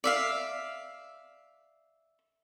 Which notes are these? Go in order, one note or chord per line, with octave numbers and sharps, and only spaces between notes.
D5 E5 F5